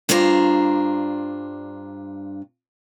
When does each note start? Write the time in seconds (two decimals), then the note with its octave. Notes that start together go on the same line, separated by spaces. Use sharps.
0.09 G2 D4 F4 C5 A#5